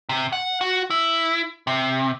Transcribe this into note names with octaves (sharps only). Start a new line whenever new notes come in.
C3
F#5
F#4
E4
C3